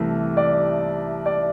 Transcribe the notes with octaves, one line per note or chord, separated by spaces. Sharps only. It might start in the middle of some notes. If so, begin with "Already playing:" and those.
Already playing: C2 C3 E3 A3
D5
D5